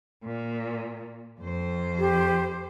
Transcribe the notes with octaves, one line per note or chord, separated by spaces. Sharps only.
A#2
F2 C5
G4